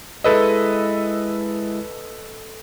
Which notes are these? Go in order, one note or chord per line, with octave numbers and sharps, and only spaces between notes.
G#3 E4 A4 B4 D#5 E6